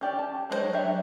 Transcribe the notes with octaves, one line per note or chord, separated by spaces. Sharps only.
C#4 G4 D5 G5
A5
F#3 G#3 C#4 C5 C#5
F#3 D4 G4 E5